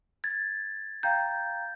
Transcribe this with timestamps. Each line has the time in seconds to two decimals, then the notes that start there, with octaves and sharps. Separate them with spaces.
0.24 G#6 A6
1.03 F5 G5 A#5 G6